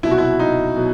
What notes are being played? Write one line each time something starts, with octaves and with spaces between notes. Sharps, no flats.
C2 B2 F#3 E4
F#4
E4
D#4
B2 F#3